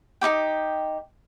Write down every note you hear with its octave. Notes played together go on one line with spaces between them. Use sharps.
D#4 E4 G4 G5